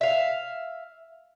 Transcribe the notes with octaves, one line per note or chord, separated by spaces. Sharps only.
E5 F5